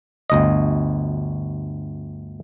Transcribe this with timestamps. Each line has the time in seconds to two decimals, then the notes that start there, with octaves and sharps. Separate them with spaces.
0.30 G1 D2 D#5